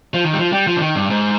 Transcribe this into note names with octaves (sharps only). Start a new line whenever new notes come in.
F3
D#3
G3
F3
G3
F3
D3
D#3
G2
G#2